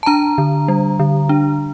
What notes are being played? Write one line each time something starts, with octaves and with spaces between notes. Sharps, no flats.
A5
D4 A#5
D3
G3
D3
D4